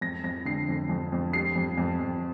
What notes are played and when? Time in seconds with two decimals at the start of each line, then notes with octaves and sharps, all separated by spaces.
0.01 F2 A#6
0.24 F2 A#6
0.45 D3 C7
0.68 F2
0.89 F2
1.12 F2
1.33 G3 C7
1.56 F2
1.78 F2
2.00 F2